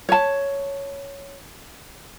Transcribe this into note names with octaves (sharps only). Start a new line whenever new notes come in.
C#5 A5